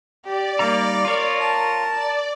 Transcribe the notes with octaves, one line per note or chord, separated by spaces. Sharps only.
G4 D5
G3 A#3 D#4 F5 A#5 D6
F4 A#4 C#5
A5
D5